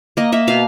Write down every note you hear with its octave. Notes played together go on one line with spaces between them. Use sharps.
A#3 D#5
A#3 E5
B2 F5